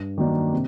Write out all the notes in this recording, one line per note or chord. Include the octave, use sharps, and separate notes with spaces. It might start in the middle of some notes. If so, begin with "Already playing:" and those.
Already playing: G2
D#3 F#3 A#3 D4
C3